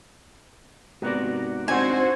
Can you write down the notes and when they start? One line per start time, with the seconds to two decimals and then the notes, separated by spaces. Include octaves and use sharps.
1.02 G#2 C3 B3 F#4 A#4 D5
1.68 C4 D4 D#4 F#4 C5 G#5